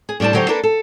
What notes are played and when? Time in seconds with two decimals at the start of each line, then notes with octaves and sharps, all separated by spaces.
0.09 G#4
0.20 A2 G3 D4 C5 A5
0.33 D3 F#3 G4 C5 C#5
0.48 A#3 D4 A4 B4
0.63 A4